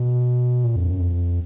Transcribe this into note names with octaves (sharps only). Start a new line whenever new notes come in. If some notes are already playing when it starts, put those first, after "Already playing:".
Already playing: B2
A#2
F2
F#2
F2